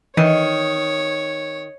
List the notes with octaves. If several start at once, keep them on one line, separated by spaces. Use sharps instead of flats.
D#3 E3 C#5